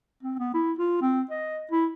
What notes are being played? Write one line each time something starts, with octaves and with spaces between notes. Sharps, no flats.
C4
B3
E4
F4
C4
D#5
E4